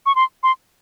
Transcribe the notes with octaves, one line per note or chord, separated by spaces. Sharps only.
C#6
C6
C6